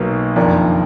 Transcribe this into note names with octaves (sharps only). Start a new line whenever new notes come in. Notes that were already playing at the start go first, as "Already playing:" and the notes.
Already playing: B1 B2 A#3 D#4
F#1 F2 D#3 A#3 D4